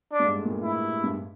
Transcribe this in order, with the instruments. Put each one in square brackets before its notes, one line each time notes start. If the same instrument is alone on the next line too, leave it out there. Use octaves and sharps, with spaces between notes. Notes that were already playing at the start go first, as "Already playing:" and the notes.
[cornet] D4
[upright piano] G2
G#2
A2
A#2
A2
[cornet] E4
[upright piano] G2